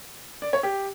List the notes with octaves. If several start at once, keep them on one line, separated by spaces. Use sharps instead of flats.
D5
C#5
G4